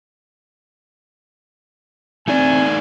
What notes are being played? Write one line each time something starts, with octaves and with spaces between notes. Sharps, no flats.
A3 C4 D#4 D5 G#5